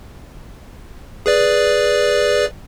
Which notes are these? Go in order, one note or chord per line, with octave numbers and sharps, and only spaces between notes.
G#4 B4 D5